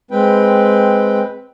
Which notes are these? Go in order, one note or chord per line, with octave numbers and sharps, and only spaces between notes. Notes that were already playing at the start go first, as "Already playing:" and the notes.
G#3 C4 B4 G5